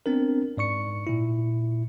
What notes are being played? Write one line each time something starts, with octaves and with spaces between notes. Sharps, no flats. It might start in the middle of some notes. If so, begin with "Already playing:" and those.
B3 C4 D4 A#4
G#2 D5 C#6 C#7
A#2 E4